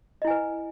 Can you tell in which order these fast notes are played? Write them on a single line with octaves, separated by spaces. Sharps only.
D#5 E4 G#5 B4